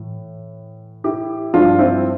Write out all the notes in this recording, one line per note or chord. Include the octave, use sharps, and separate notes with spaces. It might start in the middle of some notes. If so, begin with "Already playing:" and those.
Already playing: A2 E3
E4 G4
G2 F3 D4 F4
C4 E4